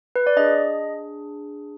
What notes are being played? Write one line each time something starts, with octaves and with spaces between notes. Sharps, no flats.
B4
D5
D4 G#4 D#5